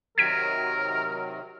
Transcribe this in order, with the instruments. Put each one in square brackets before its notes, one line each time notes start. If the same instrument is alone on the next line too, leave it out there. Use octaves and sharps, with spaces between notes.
[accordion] C3 D#3 F#3 [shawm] A#4 [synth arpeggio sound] G#6 B6 D7